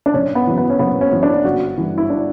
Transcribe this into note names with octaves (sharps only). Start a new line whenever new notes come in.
D4
F#1 C#4
B3
F#2 E3
B3
C#4
F#1 B3
C#4
F#2 E3
D4
G1 F#4
G2 E3
E4
D4